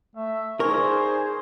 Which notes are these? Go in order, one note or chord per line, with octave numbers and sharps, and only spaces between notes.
A3 E5
D#4 G#4 A#4 C5 D5 C#6